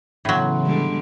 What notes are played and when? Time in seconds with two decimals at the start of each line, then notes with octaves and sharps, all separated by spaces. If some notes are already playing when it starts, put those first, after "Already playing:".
0.25 A2 C#3 E3 F#3 B3 B5 C6
0.66 D3 G3 G#3